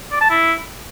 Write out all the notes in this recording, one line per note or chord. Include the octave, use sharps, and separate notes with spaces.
D5
A5
E4